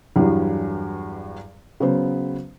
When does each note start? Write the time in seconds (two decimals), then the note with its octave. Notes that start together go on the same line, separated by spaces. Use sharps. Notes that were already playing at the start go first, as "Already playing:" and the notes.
0.16 E2 G2 F#3 G3
1.80 C#3 F#3 B3 C5